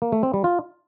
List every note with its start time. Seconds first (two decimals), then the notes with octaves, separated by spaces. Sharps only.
0.02 A#3
0.12 A3
0.23 C4
0.34 G3
0.44 F4